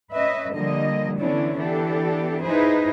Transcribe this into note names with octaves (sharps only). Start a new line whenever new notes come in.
C#4 B4 D#5 E5
D3 F3 G3 A#3 D#5
D3 E3 B3 C#4 D4 E4
E3 B3 D4 G4 A4
D#4 E4 G#4 B4 C5